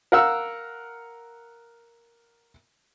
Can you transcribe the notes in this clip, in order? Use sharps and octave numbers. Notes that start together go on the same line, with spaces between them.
A#4 F5 F#5 E6